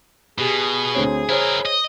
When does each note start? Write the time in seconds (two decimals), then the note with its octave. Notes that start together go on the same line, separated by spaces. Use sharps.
0.38 B2 G4 G#4
0.95 D2 C4 C#5
1.29 E4 A#4 C5 C#5
1.66 D#5